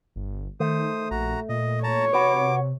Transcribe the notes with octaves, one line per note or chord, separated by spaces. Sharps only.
G1
D#3 A3 C5 D#6
A#1 F#4 A#5
A#2 D#5
C#5 A5 A#5
C3 F#4 B4 D6